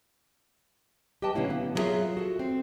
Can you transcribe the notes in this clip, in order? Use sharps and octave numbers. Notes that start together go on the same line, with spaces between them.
G4 B4 D#5 G5 A5
B2 D3 F#3 A#3 C#4 E4
B3
F#3 E4 F4 G#4 A#4 E5
F#4 A4
C4